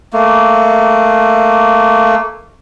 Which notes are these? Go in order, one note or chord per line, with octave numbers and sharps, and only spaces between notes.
A3 A#3